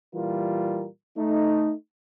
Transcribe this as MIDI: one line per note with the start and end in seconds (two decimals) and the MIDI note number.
0.15 0.86 46
0.15 0.86 52
0.15 0.86 55
0.15 0.86 65
0.15 0.86 70
1.18 1.74 57
1.18 1.74 63